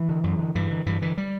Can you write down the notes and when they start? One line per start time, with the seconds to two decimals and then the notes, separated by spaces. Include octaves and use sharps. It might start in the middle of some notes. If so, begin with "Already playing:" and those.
Already playing: E3
0.09 D3
0.24 F#2
0.39 D3
0.55 G2 E3
0.71 D3
0.86 G2 E3
1.02 D3 E3
1.18 G3